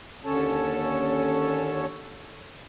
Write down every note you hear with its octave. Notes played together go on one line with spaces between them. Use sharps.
D#2 D3 C#4 A4 C#5 A5